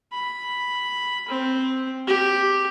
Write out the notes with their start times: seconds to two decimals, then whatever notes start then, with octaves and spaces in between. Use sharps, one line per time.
0.12 B5
1.28 C4
2.07 G4